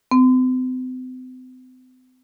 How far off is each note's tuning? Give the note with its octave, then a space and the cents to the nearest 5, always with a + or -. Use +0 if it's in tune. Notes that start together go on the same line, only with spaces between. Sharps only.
C4 -40